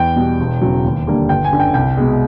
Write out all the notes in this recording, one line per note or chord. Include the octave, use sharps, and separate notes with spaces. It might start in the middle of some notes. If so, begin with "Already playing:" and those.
Already playing: E2 G5
B2 G3
E1
E2 C#3 F#3
D#2
D3 G3 A#3
G1 G5
G#5
F#2 D3
G5
C2 G5
B2 G#3